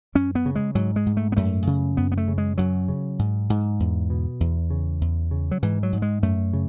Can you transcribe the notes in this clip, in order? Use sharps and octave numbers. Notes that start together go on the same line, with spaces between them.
F#2 C#4
B3
C#3
G#3
G#2 F#3
G#3
G#2
A3
B3
F#2 A3
C#3
F#2 B3
B3
A3
C#3
G#3
F#2 F#3
C#3
G#2
G#2
E2
B2
E2
C#3
E2
C#3
F#3
G#2 E3
F#3
G#2
G#3
F#2 A3
C#3